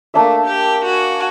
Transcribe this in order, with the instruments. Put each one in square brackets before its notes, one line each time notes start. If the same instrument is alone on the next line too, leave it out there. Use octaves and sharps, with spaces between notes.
[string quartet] A3 [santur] A#3 D4 E5
[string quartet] G4
F#4 G#5